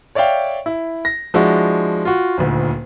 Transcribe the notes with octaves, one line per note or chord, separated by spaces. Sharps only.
C#5 D5 E5 F5 G5
E4
A#6
F3 G#3 D4 E4 F#4
F4 F#4
D#1 D2